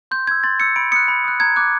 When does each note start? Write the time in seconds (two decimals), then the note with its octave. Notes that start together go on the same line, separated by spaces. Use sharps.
0.11 C6 G6
0.27 E6 G6 G#6
0.43 C6 A6
0.60 E6 G6 C#7
0.76 B5 D7
0.92 D#6 F#6 C#7
1.08 B5
1.24 D#6 F#6
1.40 A#5 G#6
1.56 D6 F#6